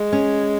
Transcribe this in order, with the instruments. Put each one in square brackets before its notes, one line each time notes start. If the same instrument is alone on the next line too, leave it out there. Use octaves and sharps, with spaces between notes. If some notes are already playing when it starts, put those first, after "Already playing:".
Already playing: [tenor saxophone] G#3
[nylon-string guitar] C#4